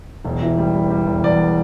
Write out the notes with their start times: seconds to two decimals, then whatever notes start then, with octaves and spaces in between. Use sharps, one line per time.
0.25 E1
0.42 E3
0.58 G3
0.74 G3
0.90 G3
1.07 E1
1.24 E2 D5